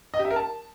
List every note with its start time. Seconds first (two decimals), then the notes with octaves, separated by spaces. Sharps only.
0.14 D#5
0.19 G4
0.25 E5
0.31 A#4
0.36 A5